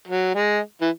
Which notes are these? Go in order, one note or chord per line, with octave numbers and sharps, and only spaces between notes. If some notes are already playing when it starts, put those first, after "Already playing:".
F#3
G#3
E3